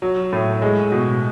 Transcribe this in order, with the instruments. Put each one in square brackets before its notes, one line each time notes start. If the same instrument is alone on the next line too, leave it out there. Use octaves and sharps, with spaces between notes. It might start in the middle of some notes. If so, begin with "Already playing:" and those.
[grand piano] F#3
A2
G#3
B2